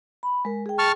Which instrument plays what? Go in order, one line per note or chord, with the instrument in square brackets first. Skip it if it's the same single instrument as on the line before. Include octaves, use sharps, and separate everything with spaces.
[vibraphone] B5
G#3 A#4
G#4 G5
[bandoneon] A5 C#6 F6